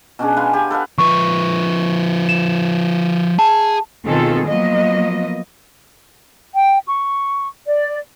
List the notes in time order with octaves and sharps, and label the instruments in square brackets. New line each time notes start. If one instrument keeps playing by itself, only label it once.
[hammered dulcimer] B2 C#4 D4 G#4
B4 F5 G#5 C6
G4 G#5
A4 B4 F5 F#5
[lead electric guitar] F3 B4 [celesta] C#6
[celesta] E7
[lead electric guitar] G#4 [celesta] A5
[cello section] B2 D#3 C4 F4 G#4 A4
F3 F#3 A#3 B3 D#5
[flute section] G5
C#6
D5